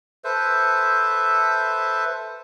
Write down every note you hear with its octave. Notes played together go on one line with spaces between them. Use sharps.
A4 B4 C5 E5